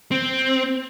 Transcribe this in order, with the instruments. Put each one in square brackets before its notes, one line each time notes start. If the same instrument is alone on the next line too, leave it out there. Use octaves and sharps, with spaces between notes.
[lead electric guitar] C4